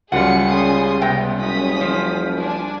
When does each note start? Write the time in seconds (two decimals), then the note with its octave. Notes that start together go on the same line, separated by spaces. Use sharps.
0.12 C#2 F#2 G3 F4 G#4 F#5 C#7
0.50 C#3 G#5 C6 D#6
1.02 C3 B3 G5
1.39 F#1 C#4 D#6 B6
1.81 F3
2.38 D4 G#5